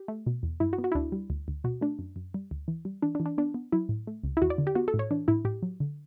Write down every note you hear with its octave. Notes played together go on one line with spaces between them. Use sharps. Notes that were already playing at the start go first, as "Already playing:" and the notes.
Already playing: G4
A3
B2
E2
G2 E4
F#4
B3
F#4
E4
D2 D4
G3
D2
D2
B2 F#4
A3 D4
F#2
F#2
G3
D2
E3
G3
E3 D4
D4
E3
D4
B3 D4
B3
F#3 E4
A2
A3
C#2
E4
E2 F#4
D5
D3
G4
B3 F#4
A4
A2
C#5
E3 D4
A2 E4
A2 G4
F#3
D3